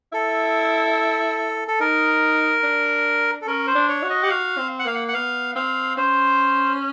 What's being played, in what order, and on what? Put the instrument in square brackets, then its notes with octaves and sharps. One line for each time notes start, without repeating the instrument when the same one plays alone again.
[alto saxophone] E4 [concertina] A4
[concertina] A4
[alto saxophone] D#4 [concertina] A#4
[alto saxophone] D4
[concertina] A4
[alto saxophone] C#4 [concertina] A#4
[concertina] C5
[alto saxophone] D4
[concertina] C#5
[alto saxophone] F#4
[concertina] D#5
[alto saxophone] G4 [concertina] F#5
[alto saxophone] F#4 [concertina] F5
[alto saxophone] C4
[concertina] F#5
[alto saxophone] A#3 [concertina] F5
[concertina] F#5
F#5
[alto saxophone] B3 [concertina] F5
[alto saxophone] C4 [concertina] F5
[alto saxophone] C#4 [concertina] C5